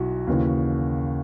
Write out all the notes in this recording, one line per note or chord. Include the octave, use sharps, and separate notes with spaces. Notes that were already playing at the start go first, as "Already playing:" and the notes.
Already playing: B1 E4 F#4
D#2 C#3 E3